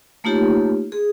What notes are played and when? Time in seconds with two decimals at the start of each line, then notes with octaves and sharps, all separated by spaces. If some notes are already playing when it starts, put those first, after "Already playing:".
0.24 A3 A#3 D#4 F4 G4 C#5
0.92 G#4